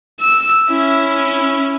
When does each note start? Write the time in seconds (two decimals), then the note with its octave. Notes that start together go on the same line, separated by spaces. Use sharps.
0.21 E6
0.70 C#4 E4